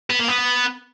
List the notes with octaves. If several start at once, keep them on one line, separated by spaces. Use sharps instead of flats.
B3
A#3
B3